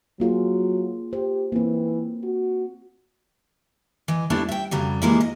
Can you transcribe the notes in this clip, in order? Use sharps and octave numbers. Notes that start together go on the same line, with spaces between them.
F#3 A#3 F4 G#4
G4 C5
E3 A#3 C4
F#4
E3 D#5
G3 A3 B3 D4 E4 A5
E5 G5
F2 C#3 F#3 G3
E3 F3 G3 G#3 A#3 E4
D#5